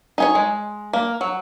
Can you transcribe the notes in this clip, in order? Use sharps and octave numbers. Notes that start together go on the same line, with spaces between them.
D#4 G#4 C#5
G#3
A#3
F#3